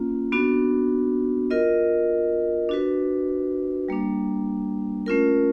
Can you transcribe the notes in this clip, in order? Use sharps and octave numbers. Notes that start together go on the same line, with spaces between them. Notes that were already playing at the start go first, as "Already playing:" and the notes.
Already playing: A#3 C#4 F4
B3 D4 F#4
F4 A#4 D#5
D4 F#4 B4
G3 A#3 D4
A3 C#4 F4 A#4